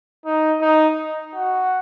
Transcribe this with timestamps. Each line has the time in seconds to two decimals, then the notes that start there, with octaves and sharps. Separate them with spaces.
0.26 D#4
0.61 D#4
1.36 F#4